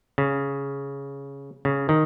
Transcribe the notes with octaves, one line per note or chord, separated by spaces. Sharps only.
C#3
C#3
D#3